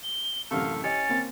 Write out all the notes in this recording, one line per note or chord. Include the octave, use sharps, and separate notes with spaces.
G7
A1 F#2 C3 A3 F5
C#4 G4 D#5 A6
A#3 C4